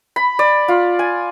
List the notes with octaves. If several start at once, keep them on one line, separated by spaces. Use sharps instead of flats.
B5
D5
F4
G#5